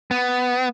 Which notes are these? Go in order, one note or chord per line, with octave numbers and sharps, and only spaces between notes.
B3